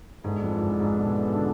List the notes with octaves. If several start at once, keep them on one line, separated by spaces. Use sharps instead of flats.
G#2 E3 B3 D4 A4
F2
G#2
G#2
B2
D3